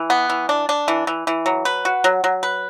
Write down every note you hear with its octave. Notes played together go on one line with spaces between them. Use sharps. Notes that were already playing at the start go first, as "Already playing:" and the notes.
Already playing: E3
B3
E3
D4
D4
E3
E3
E3
F#3
B4
F#4
F#3
F#3
B4